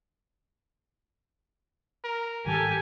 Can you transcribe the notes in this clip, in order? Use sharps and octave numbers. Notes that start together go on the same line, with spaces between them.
A#4
G#2 D#3 G3 G4 A4 G#5